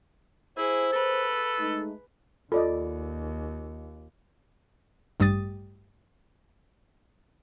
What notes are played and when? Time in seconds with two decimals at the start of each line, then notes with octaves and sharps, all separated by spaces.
0.57 E4 G#4 C5
0.93 A4 B4
1.59 G#3 A3 D#4
2.52 D#2 F4 A4 D5 D#5
5.20 A1 G2 G3 D#6 A6